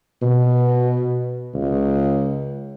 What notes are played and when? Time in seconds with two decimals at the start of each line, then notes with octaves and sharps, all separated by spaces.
0.22 B2
1.55 C#2